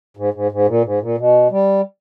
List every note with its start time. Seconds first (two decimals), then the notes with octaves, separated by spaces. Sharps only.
0.17 G#2
0.34 G#2
0.52 G#2
0.67 A#2
0.84 G#2
1.01 A#2
1.18 B2
1.51 G3